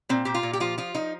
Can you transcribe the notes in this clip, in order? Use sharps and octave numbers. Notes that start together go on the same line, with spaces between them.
A#2 C4
A#2 G4
F4
A#2
G4
F3 F4
F3 F4
F3 D#4